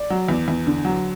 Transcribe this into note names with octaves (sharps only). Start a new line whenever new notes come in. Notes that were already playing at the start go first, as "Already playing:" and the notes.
Already playing: D5
F#3
E2
E2
D3
F#3